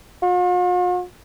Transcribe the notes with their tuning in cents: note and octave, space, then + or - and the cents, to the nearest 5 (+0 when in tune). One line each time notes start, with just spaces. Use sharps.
F4 +45